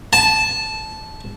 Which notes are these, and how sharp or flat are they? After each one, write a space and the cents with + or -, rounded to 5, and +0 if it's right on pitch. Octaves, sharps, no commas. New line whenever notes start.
A5 -15